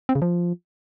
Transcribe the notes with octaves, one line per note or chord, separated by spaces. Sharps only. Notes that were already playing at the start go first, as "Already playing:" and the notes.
C4
C#3
F3